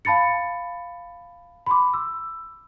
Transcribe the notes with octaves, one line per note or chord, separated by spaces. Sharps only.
F5 A5 B5 A6 C#7
B5 C6 D6
E6